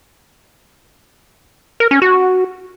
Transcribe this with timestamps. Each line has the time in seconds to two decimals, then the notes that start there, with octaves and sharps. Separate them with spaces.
1.80 A#4
1.91 C#4
2.02 F#4